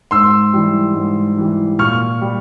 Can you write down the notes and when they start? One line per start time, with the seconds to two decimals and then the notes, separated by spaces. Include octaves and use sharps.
0.11 G#2 C6 E6
0.53 E3 G3
0.95 G#2
1.37 E3 G3
1.78 A#2 C#6 F6
2.21 G3